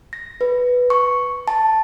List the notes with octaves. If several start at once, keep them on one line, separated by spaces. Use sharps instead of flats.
A#6
B4
C#6
A5